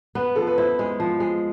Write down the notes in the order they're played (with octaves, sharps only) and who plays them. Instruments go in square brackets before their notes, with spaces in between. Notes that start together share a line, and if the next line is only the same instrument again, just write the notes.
[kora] B3 [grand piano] B4
[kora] F3 [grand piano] A4
[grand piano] B4
[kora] E4 [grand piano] C5
[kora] G#3
F3
G#3